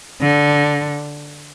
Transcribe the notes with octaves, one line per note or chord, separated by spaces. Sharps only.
D3